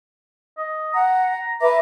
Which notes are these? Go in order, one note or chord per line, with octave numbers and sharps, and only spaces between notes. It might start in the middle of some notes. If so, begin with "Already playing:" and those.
D#5
F#5 A#5
B4 E5 A#5 D6